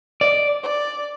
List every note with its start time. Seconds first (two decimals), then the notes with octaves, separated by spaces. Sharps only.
0.21 D5 D#5
0.63 D5